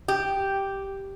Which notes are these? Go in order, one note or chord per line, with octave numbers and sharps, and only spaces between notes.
G4